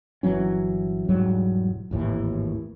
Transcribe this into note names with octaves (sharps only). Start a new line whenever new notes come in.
G1 E3 F#3 C#4
E1 G#2 F#3 G3
G#1 D#2 A2 E3